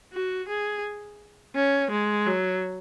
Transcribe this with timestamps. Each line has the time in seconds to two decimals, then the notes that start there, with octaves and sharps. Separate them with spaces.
0.13 F#4
0.49 G#4
1.56 C#4
1.92 G#3
2.27 F#3